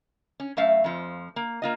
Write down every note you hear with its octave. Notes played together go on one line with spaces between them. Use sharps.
C#4
F#2 A3 E5 F5
F2 F3
A#3
A#3 F4 D#5